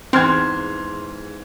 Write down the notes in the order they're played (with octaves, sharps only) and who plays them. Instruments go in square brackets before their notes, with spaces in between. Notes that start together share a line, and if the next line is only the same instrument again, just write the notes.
[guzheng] E2 G#2 [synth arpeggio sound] C4 [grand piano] C6 F6 G#6